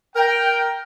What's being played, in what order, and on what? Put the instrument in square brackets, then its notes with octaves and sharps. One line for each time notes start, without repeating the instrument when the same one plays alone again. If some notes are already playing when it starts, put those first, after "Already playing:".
[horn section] A#4 G5